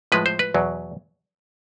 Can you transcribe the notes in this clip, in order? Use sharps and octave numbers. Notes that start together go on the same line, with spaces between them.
A2 F3 G#3 B4
C5
B4
E2 B2 F#3